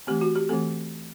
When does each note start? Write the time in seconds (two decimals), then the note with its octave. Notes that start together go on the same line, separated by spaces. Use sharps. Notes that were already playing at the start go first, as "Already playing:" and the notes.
0.07 E3 A3 C4 G4
0.21 F#4
0.36 G4
0.49 E3 A3 C4 A4